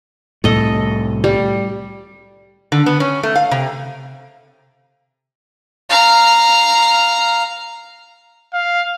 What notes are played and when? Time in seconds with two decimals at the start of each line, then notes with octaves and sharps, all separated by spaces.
0.44 C2 A2 A3 A4 D#5
1.24 G3
2.72 D3
2.86 B3
3.00 C#4
3.23 A3
3.35 F5
3.51 C3
5.89 F5 A#5
8.54 F5